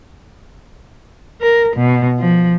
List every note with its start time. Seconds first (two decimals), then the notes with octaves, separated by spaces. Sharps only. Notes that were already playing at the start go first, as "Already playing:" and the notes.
1.40 A#4
1.77 B2
2.18 F3